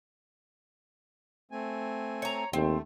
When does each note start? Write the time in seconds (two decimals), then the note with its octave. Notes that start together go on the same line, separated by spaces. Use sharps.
1.52 A3 C4 G#5
2.22 C#5 A#5
2.53 D#2 A3 C4